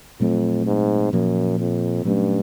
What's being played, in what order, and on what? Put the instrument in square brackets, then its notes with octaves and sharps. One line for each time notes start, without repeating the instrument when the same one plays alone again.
[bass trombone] F2 [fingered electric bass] A#2 F#3 A3 C4
[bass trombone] G#2
[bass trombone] F#2 [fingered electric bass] A#2 F3 A#3
[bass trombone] F2
[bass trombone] G2 [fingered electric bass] A#2 F#3 A3 C#4